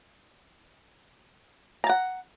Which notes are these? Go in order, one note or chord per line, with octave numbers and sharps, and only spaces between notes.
F#5 A5 A#5